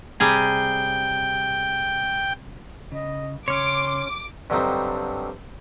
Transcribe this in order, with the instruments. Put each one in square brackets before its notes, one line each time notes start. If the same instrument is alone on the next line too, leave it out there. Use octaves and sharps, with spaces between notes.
[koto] C3 G3 G#4 [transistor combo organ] G5
[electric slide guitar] C#3 [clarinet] D#5
[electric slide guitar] C#3 [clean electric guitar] C#4 C#5 [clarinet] C6 [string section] D6
[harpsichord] G2 D3 F#3 G3 C4 D#4